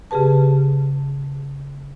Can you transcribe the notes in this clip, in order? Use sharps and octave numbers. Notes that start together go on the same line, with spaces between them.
C#3 G4 G#4 B4 A5